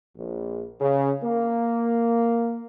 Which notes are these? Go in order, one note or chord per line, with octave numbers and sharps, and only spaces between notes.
A#1
C#3
A#3